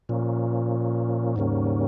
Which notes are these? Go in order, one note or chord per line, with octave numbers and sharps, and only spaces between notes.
A#2 F3 A#3 C#4
D#2 G#2 C#3 G3 A#3 C#4